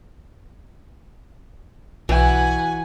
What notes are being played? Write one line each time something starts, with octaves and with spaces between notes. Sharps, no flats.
B1 E3 F#4 B4 G#5